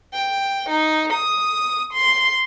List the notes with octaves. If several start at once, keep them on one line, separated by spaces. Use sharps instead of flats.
G5
D#4
D#6
C6